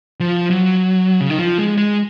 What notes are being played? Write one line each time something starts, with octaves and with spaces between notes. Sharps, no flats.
F3
F#3
C#3
D#3
F3
G#3
G#3